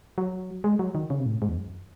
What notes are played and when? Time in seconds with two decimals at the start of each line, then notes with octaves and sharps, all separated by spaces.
0.18 F#3
0.64 G#3
0.79 F#3
0.95 D#3
1.10 C#3
1.19 C3
1.26 A2
1.42 G#2
1.49 E2
1.57 F#2